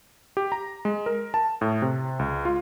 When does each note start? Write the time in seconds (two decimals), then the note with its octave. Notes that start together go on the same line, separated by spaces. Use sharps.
0.37 G4
0.52 A#5
0.85 G#3
1.06 A#4
1.34 A5
1.61 A2
1.82 C3
2.19 C#2
2.45 F4